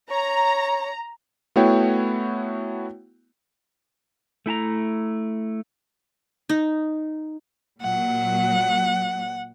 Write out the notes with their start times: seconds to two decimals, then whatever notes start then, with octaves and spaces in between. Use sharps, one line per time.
0.11 C#5 A#5
1.56 A3 B3 E4 F#4 C#5 G5
4.46 A3 E4 A5 A#5
6.49 D#4
7.82 A#2 F#3 F#5